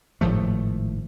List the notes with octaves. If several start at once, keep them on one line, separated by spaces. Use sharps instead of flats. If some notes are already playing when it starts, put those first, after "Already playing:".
G#1 A2 F3 A3